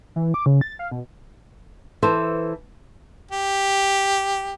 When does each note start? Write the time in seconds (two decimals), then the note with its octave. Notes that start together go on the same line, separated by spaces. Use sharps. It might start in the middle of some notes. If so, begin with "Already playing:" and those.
0.16 E3
0.34 D6
0.46 C#3
0.61 A6
0.79 F5
0.92 B2
2.02 E3 A4 C5
3.31 G4